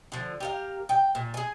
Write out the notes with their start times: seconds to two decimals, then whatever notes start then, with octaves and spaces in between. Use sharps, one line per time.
0.12 D3 F3
0.40 G4 A#4 F5
0.89 G5
1.15 A#2
1.34 G#4 G#5